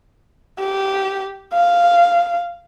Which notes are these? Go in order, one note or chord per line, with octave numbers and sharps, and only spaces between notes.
G4
F5